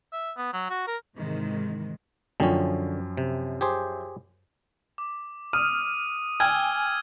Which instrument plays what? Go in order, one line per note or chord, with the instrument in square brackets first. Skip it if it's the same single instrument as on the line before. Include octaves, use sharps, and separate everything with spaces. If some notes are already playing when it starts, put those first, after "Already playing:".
[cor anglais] E5
B3
F#3
F#4
A#4
[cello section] G#2 C3 D#3 E3 G#3
[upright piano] F#2 F3 G5 [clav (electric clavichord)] D3 C#4
[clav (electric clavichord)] C3
G4 G#4 C5
[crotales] D6
[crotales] D#6 D#7 [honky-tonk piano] F6
[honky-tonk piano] G5 G#5 [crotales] E6 F6 G#6